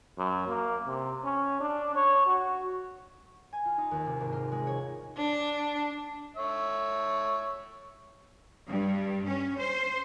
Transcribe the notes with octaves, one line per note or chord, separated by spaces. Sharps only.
F#2
A#3
C3
C#4
D4
C#5
F#4
G#5
F4
D#4
D#2
C3
G#1
F4
G#3
C#5
D4
C#5 E5
G2
C#4
C5